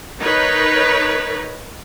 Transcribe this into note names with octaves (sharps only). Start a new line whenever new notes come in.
D#4 A#4 B4 C#5